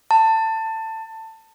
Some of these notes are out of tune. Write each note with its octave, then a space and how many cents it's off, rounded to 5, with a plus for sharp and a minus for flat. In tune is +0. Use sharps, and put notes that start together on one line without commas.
A5 +20